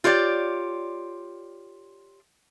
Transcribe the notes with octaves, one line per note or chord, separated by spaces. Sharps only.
F4 G4 C#5 D5